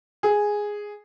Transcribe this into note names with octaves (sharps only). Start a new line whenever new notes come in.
G#4